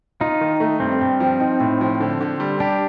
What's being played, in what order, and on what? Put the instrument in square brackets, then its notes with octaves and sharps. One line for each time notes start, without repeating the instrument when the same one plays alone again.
[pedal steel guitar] D#4 [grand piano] F4
[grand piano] D#3
A3
[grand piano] G2 [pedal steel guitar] C4
[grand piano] G2
F3
D#4
A2
F3
D3
D3
G3
[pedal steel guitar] D4 [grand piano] G4